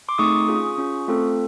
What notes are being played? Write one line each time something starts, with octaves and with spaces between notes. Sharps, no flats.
C6 D6
A3 C4 D#4 G#4 C#6 D#6
C#4 F4 G#4
C#4 F4 G#4
A3 C4 F4 A4